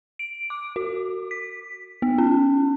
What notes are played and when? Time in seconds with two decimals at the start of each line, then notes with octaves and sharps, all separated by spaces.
0.19 D7
0.50 D6
0.76 F#4
1.31 B6
2.02 B3
2.18 C#4